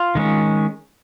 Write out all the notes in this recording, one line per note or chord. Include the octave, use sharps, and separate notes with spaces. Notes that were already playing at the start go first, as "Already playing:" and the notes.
Already playing: F4
D#3 G#3 C#4